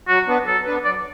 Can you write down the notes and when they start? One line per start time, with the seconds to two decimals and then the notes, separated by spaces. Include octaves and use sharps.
0.08 F#3 F#4
0.28 B3 D4 B4
0.46 F#3 A4
0.66 B3 D4 B4
0.84 F#3 D5